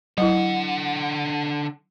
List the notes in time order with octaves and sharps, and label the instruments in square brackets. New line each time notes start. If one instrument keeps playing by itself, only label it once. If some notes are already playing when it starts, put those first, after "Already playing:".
[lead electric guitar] D3 F#5 [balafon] F#3 E4